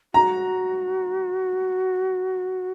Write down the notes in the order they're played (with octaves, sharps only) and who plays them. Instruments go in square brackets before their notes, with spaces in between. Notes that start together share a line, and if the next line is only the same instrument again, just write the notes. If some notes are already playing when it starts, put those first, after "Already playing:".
[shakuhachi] F#4 [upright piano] A#5